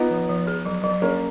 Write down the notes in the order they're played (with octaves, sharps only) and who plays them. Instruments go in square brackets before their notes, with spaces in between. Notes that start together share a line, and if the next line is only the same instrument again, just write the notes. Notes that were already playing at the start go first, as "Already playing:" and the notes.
Already playing: [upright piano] B3 D#4 [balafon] F4
[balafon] F3
F3
G#4
F#3
F#3
[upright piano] A#3 C#4 [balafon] G#4